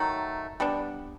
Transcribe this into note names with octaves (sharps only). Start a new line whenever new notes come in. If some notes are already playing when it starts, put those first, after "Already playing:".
Already playing: D#3 F#3 A3
G3 B3 D4